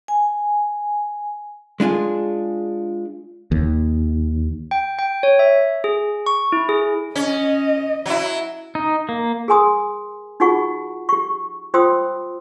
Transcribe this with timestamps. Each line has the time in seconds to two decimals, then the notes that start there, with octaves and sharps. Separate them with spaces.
0.08 G#5
1.80 G#3 D4 F4 G#4
3.52 D#2
4.71 G5
4.99 G5
5.23 C#5
5.39 E5
5.84 G#4
6.26 C#6
6.52 E4
6.69 G#4
7.15 C#4 D#5
8.06 F#3 E4
8.75 D#4
9.09 A#3
9.48 G#4 A#4 G#5 C6 D#6
10.40 D#4 F4 F#4 G#4 F#5 C#6
11.09 G4 C#6
11.74 F4 C5 G5 C6 D#6 E6